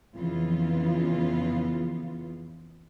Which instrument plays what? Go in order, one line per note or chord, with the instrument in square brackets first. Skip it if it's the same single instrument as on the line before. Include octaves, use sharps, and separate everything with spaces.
[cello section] F2 C#3 E3 B3 F4